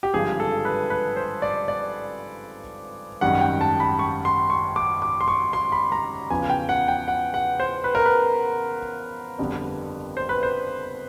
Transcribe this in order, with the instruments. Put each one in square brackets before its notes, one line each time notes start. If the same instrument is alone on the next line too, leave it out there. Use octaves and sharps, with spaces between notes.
[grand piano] G4
G#1 G2 D3 F3 G#4
A4
B4
B4
C5
D5
D5
G#1 F#2 D#3 G3 F#5
G5
A5
B5
C#6
C6
C#6
D6
D6
C6
C#6
C6
B5
A#5
E2 C#3 F3 G#5
G5
F#5
G5
F#5
F#5
C5
B4
A#4
B4
G1 F2 D3 G3
C5
B4
C5